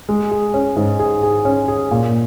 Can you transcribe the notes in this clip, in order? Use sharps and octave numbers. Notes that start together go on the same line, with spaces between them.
G#3
G#4
C#4
G#2
G#4
G#4
C#4
G#4
A#2